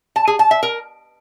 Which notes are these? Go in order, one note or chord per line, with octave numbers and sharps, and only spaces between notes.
A5
G#4
A5
E5
A#4